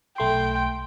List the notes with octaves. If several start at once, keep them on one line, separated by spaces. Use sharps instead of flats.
B1 A3 G5 C6